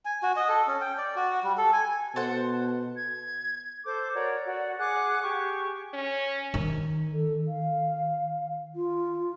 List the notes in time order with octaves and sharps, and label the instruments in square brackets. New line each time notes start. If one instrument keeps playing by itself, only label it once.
[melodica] G#5
F#4
D#5
A4
C#4
G5
D5
F#4
G3
A4
G#5
[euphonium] B2 [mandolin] A4 C5 F#5
[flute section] G#6
A4 C5 D6 G6
F#4 A#4 C#5 D5
F#4 D5
G#4 F#5 D6 F#6
G4 G#4 C#6
[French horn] C#4
[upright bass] D#3
[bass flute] A4
F5
F4